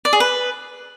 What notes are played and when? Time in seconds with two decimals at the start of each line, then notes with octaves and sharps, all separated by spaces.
0.05 D5
0.13 G#4
0.20 B4